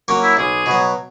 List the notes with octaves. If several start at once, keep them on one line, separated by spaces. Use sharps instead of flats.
F#3 A#3 C#4
E4
B1 G#4
B2
F#3